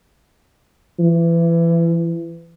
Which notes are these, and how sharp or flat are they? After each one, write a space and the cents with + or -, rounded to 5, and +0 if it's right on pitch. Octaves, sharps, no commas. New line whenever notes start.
E3 +25